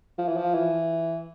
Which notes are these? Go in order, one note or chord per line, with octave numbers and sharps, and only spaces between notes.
F3
E3
F3
E3